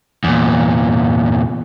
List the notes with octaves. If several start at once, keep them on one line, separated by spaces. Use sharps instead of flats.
E2 A#2